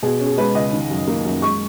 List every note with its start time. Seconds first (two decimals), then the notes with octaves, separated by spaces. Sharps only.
0.03 B2 G#4
0.20 C#4
0.26 G#4
0.38 G#3 B4
0.55 C#2 D#5
0.72 D#3
0.90 F#2
1.07 A#3
1.25 F#2
1.42 G#3 C#6